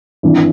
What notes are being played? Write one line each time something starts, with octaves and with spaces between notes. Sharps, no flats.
G#1 G2 E3